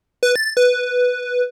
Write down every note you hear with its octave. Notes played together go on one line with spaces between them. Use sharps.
B4
A6
B4